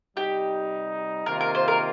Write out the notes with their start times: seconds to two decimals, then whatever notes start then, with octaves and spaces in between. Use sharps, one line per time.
0.17 C3 G3 D#4 G4
1.26 C3 D#3 A#3 F4 A#4
1.41 A#4
1.55 C5
1.68 A#4